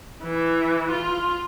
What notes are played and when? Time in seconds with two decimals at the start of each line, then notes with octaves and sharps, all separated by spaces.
0.22 E3
0.90 F4